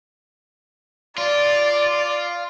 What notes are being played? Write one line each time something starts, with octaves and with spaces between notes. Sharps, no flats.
F4 D5